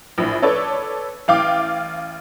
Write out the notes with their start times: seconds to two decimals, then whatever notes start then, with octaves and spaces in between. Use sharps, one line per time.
0.18 A#1 A2
0.42 A4 B4 C#5 D5
1.28 A1 F5 G5 D6